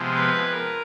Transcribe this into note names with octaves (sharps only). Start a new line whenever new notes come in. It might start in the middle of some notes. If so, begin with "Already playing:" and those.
Already playing: C3 F3 G#3 B3
B4
A#4